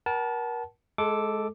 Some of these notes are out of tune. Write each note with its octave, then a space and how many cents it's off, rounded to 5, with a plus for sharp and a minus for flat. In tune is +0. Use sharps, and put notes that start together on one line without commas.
A#4 +35 F#5 +30 A5 -20
G#3 +25 A4 +0 D6 +0